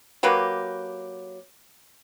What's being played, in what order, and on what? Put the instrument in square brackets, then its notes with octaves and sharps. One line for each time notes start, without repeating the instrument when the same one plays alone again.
[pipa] F#3 A#3 G4 B4